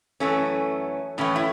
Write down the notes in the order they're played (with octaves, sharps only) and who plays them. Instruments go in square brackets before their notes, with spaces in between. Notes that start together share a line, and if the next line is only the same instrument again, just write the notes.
[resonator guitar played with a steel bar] F#2 E3 A3 C#4
A2 E3 A3 C#4
E4